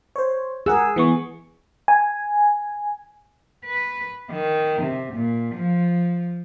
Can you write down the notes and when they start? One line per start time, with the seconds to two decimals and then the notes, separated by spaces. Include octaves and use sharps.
0.16 C5 C#5
0.66 G#4 A#4 F#5 E6
0.96 E3 B3 C#6
1.88 G#5
3.65 B4
4.31 D#3
4.82 C3
5.13 A#2
5.55 F3